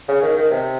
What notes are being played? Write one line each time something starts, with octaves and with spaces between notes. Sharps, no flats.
C#3
D#3
D#3
C3